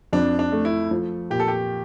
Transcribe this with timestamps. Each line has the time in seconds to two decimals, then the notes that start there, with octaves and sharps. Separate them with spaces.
0.13 F2 D4
0.39 D4
0.52 A3
0.65 E4
0.91 F3
1.30 A#2 G4
1.40 A4
1.48 G4